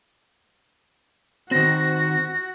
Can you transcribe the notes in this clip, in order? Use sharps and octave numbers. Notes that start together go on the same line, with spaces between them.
D#3 C4 F#4 A#6